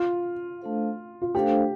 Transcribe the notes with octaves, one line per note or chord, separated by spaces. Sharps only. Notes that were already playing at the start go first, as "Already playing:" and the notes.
Already playing: F4
A3 D4 A4 C5 F5
F4
A3 D4 G4 A4 C5 F5